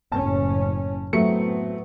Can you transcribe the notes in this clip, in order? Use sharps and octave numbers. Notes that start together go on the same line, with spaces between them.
F#1 A2 C#4 A5
A2 F#3 A3 B3 C4 C#7